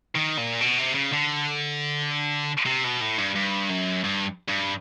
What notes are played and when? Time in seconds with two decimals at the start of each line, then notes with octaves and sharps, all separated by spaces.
0.15 D#3
0.37 A#2
0.61 B2
0.78 C3
0.94 C#3
1.13 D3
2.66 C3
2.84 B2
3.01 A2
3.18 G2
3.35 G2
3.69 F#2
4.04 G2
4.49 G2